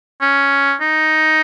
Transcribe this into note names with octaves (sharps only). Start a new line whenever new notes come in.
C#4
D#4